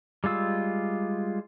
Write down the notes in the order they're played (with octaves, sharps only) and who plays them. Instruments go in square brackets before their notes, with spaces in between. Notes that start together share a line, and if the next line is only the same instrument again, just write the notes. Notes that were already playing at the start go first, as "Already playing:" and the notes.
[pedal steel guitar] G3 G#3 F4 E6